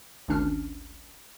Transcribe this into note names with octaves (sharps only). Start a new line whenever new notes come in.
G#1 D2 D#3 C#4 D4 F6